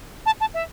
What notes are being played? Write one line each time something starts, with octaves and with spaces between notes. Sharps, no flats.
A5
A5
E5